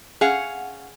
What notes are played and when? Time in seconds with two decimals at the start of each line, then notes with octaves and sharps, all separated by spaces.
0.21 C#4 G#4 F5 F#5